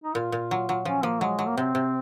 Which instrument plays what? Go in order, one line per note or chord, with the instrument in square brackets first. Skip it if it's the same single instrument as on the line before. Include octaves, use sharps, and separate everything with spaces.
[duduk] D#4
[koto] A#2 [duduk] F4
[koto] A#2
F#3
F#3
[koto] F3 [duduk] C#4
[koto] F3 [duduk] A#3
[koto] F#3 [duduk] G#3
[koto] F#3
[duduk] A#3
[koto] C3 [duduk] C4
[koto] C3